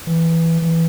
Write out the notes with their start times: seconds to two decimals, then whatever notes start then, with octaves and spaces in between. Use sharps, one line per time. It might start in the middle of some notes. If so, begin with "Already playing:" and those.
0.07 E3
0.62 E3